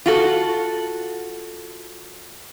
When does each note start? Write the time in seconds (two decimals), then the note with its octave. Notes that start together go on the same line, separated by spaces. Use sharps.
0.06 F4 F#4 A4